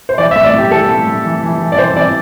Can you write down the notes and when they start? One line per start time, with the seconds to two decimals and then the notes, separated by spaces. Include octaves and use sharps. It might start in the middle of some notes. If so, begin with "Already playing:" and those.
0.09 C5
0.18 E3 D5
0.31 E5
0.36 A2
0.44 D5
0.54 A2 G4
0.71 E3 A4
0.89 A2
1.07 A2
1.25 E3
1.43 E3
1.60 E3
1.72 D5
1.79 E3 C5
1.96 E3 D5